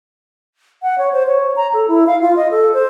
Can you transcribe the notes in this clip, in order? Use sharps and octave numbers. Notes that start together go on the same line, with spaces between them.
F#5
C#5
C5
C#5
A#5
A4
E4
F5
F4
D#5
A4
C5